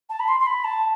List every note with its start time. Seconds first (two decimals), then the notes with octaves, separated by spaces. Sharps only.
0.09 A5
0.19 B5
0.28 C6
0.40 C6
0.46 B5
0.64 A5